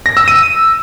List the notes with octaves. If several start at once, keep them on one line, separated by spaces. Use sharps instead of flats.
A#6
E6
D#7